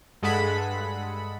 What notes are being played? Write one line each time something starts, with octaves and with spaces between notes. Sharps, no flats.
G2 G#3 G#4 A4 F#5 B5